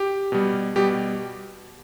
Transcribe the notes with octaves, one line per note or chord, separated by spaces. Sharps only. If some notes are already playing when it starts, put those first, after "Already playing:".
Already playing: G4
B2 G3
B2 G3 G4